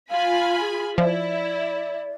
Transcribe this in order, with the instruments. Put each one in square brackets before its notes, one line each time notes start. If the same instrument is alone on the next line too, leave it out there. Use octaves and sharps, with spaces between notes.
[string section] F4 G#5 B5 [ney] F5
[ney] G#4
[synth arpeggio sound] F3 [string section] E4 [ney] D5